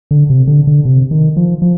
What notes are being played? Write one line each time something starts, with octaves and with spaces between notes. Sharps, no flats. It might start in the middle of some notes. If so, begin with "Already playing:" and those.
D3
C3
D3
D3
C3
D#3
F3
F3